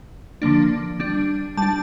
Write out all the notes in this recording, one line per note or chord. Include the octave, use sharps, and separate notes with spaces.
D3 F3 A#3 D4
G3 D4
G3 D4 A5